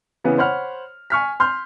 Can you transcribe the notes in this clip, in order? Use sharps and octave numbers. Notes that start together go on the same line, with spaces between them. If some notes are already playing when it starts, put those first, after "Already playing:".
C#3 E3 B3
C5 C#5 F#5 B5 F6
G#5 C#6 F6 B6
C6 F6 G6